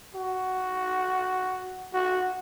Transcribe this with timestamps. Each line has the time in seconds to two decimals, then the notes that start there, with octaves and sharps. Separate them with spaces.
0.15 F#4
1.93 F#4